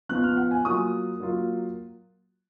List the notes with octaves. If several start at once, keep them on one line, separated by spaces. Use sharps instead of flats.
F3 B3 F4 F#6
F6
F#5
G#5
F#3 A#3 F4 D#6
F#3 A#3 F4